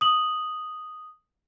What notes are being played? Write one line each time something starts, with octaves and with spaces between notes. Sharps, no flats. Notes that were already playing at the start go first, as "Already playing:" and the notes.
D#6 F#7